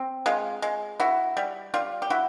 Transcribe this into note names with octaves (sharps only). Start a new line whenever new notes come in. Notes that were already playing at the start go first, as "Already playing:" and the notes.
Already playing: C4
G#3 F4
G#3
E4 F#4
G3
G3 F4
G4
E4 F#4